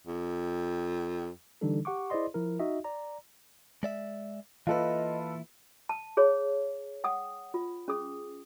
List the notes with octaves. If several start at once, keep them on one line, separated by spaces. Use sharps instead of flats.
F2
D3 E3 G3 D4 D#4 A4
G4 F#5 C#6 D6
E4 G#4 C5 D5 D#5 C6
F3 E4 A#4
D#4 F#4 D#5 E5
D5 A#5
G#3 D5 E5
E3 A#3 E4 F4 A4 B4 D#5
A5
G#4 C#5
F#5 G5 D#6
F4
C#4 G#4 D#6